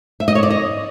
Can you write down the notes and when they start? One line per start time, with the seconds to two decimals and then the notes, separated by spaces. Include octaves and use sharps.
0.20 E5
0.28 D#5
0.35 C#5
0.43 D5
0.50 D#5